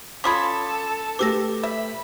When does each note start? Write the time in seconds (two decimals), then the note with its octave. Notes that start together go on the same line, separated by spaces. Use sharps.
0.24 C#4 F4 A4 B5 D6 D#6 G#6
1.19 A3 G4 B4 D6 E6 A#6
1.63 E5 B5